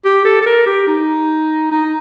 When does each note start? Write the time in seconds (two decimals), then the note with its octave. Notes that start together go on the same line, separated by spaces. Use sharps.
0.05 G4
0.25 A4
0.42 A4
0.46 A#4
0.66 G4
0.88 D#4
1.72 D#4